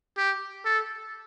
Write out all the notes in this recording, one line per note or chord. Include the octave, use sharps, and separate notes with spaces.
G4
A4